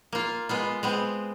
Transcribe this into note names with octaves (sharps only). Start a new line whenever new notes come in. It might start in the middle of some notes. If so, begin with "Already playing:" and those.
A#3 F4
G#3 B3 F4
G#3 B3 C4